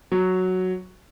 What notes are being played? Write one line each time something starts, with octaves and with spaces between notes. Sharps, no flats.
F#3